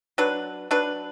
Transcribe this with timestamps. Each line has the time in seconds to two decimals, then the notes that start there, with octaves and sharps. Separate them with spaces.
0.18 F#3 D4 B4
0.71 F#3 D4 B4